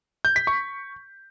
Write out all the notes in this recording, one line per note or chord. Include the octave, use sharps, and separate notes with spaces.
G6
B6
C#6